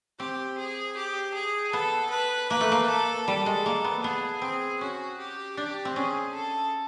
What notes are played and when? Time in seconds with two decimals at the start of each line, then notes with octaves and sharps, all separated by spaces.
0.19 C4 G4
0.59 G#4
0.97 G4
1.35 G#4
1.73 B3 A4
2.11 B4
2.50 A#3 B4
2.61 A3
2.72 A#3
2.88 A4
3.27 G3 A4
3.46 G#3
3.66 A#3
3.84 B3
4.03 B3 G#4
4.42 C4 G#4
4.81 C#4 F#4
5.18 G4
5.57 D4 G4
5.85 C4
5.95 C#4 G#4
6.33 A4